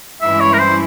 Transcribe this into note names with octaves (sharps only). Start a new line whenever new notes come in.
G2 E3 G#3 C#4 E4 E5
C#5
A#4
C5